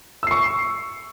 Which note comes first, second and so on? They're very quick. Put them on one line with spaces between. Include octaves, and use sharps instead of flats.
E6 C7 C#6